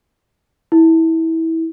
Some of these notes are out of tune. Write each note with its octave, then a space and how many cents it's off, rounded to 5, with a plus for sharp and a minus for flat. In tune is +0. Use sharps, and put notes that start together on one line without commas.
E4 -20